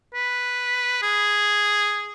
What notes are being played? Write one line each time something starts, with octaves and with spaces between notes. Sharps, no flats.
B4
G#4